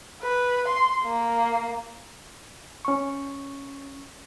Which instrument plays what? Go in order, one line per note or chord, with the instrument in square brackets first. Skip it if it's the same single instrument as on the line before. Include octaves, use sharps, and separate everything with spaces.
[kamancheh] B4
C6
A#3
[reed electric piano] C#4 C#6